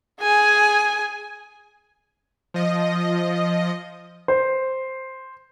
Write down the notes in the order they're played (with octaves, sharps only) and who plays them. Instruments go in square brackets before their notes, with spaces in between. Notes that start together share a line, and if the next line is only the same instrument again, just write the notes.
[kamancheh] G#4 G#5
[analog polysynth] F3 D#5
[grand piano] C5